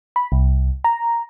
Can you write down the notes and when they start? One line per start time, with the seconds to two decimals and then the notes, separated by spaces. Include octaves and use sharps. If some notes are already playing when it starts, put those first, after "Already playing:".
0.16 B5
0.32 C2
0.84 A#5